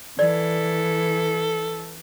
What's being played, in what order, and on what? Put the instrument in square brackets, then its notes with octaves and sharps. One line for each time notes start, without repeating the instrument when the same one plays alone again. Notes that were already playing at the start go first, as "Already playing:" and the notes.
[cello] E3 [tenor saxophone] A4 [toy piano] D5